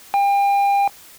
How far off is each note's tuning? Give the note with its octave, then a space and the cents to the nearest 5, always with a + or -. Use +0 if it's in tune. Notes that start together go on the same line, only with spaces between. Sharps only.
G5 +35